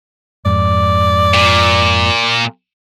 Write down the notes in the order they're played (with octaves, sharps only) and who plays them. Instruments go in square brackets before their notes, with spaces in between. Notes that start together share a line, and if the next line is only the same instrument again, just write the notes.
[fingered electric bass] F2 G#2 [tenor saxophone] D5
[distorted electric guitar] A#2